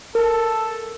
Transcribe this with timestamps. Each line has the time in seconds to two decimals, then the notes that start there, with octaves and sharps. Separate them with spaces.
0.15 A4 A#4